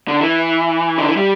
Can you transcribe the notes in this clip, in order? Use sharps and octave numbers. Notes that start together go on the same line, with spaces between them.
D3
E3
D3
E3
G3